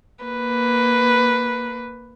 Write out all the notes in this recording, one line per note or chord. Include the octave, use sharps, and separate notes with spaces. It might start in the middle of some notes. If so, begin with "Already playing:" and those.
A#3 B4